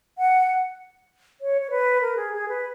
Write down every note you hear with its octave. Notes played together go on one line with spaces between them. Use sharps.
F#5
C#5
C#5
B4
A#4
G#4
G#4
B4